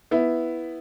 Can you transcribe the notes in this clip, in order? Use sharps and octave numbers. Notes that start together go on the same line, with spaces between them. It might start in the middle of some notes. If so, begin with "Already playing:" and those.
B3 E4